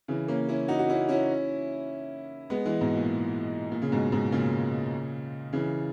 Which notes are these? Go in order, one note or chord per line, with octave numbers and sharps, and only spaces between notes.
C#3 E3
A#3 C#4
C#4 E4
D#4 F#4
F#4
C#4 E4
C#4 E4
G#3 B3
E3 G#3
G#2 B2
A#2
A#2
C#3
G#2 B2
G#2 B2
A#2 C#3
C#3 E3